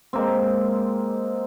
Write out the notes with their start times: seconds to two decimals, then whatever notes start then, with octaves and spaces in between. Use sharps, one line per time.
0.13 G#3 A#3 C4